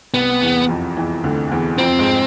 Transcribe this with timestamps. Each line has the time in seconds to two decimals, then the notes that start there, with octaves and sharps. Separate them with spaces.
0.14 C2 C3 B3
0.41 E2 E3
0.69 F2 F3
0.97 E2 E3
1.24 D2 D3
1.52 E2 E3
1.78 F2 F3 C4
1.99 G#2 G#3